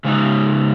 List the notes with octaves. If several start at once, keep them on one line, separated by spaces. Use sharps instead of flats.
C#3 G#3 D#4